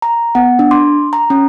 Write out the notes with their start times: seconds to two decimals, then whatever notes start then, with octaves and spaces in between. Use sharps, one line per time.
0.02 A#5
0.35 B3 F#5
0.59 D4
0.71 C6 D6
1.13 A#5
1.30 C#4